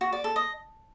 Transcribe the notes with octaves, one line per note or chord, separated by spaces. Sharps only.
F#4
D5
A4
D#5